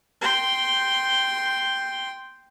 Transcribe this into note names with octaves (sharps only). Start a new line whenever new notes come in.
G5 C6